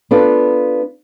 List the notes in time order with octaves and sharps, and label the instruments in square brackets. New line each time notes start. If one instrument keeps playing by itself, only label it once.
[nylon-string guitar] B3 D4 F4 A4 B4